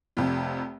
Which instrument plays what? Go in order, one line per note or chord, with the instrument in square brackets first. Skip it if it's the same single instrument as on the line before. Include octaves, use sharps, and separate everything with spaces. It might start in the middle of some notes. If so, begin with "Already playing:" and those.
[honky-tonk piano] F1 F2 C3